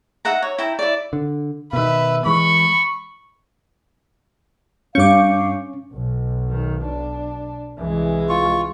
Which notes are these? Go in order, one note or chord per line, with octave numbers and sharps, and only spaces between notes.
D#4 E5 F#5 A#5
C#5
E4 E5 G5 A#5
E4 D5
D3
B2 D#3 B4 E5
E3 G#3 B5 C#6
G2 C#4 F5 C#6 D6 G6
B1
D#3
D4
C2 E3 G#3
F4 C#6